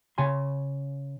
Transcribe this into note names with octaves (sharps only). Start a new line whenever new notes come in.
C#3 G#5 C6